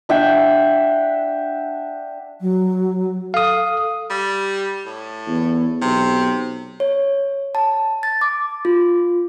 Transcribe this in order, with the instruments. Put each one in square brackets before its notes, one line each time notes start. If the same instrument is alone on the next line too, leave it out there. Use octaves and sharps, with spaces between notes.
[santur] D4 E5 F#5 G5
[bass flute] F#3
[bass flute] A4 [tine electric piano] F5 D#6
[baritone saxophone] G3
A2
[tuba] E2
[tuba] B1 [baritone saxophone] C3
[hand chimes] C#5
A5
A6
D6
F4